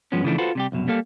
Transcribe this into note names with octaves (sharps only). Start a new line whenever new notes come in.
G2 F3 G#3 B3 C#4
C#3 E3 F3 A3 D4
F4 F#4 A4 B4 C5
C3 G3 G4
C2 F#2 B2
G3 A#3 A4 F5